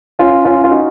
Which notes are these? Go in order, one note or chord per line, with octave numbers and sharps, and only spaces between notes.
C#4 F4
C#4 F4
F4
D#4 F#4